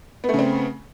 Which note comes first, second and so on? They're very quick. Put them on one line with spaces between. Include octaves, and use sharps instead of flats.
B3 A3 C#3 C4